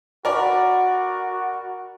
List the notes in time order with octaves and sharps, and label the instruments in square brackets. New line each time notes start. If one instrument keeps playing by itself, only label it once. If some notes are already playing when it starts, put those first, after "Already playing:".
[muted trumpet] F#4 [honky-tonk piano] A#4 D5 B5